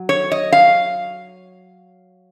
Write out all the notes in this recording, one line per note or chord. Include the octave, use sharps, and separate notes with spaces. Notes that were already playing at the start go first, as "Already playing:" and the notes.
Already playing: F#3
C#5
D#5
F5